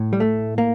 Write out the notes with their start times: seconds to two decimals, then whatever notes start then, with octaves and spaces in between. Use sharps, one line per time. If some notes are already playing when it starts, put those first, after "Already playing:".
Already playing: A2
0.13 G3
0.20 A3
0.58 A#3